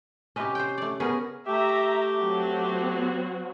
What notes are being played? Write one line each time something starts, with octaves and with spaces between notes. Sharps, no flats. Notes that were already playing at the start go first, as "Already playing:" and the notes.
C3 C#4 G4 B4 D#5
C5 G5
A3 D5
C#3 B3 C#4 G#4 A#4
A3 G4 E5 A#5
F#3 C4 F#4